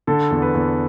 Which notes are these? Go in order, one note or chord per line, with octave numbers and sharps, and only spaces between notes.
D3 A4
E2
B4
E2